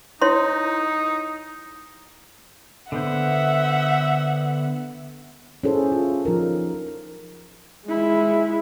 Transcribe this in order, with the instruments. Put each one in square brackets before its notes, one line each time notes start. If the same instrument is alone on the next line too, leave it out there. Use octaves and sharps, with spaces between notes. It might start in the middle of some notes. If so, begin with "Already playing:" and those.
[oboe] D#4 [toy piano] E4 C#5 C6
[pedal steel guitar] D3 B3 C5 [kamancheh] E5 F#5
[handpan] C#4 E4 G#4 A4 C5
F4
F3 D#4 A#4
[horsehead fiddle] G#3 E4